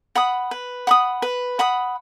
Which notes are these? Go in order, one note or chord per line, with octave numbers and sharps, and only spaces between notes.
F#5 B5 D#6
B4
F#5 B5 D#6
B4
F#5 B5 D#6